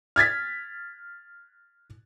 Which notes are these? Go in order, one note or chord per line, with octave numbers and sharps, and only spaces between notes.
F6 G#6 A6 B6